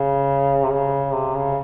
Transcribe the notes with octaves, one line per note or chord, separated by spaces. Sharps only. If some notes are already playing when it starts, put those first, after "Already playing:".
Already playing: C#3
C3
C#3
C3
C#3